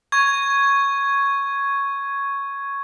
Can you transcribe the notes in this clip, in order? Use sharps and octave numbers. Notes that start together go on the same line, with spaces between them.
C#6 G#6